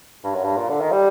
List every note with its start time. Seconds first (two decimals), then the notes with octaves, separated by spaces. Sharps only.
0.24 G2
0.34 F#2
0.44 G2
0.57 A#2
0.69 D3
0.80 D#3
0.91 G3